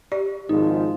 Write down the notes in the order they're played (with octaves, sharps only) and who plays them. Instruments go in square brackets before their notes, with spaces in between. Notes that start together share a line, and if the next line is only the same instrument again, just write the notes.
[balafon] G4 D5
[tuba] G#1 [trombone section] G#2 F3 [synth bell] D#4